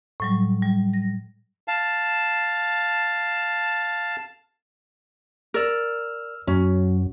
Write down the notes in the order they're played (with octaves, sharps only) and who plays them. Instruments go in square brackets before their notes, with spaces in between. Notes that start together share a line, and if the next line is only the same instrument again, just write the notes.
[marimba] A2 F#3 G3
G3
A#6
[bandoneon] F5 A5
[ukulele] A#4 D5 [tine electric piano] E6 F6
[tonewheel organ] F#2 [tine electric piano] F#3 [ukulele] C#4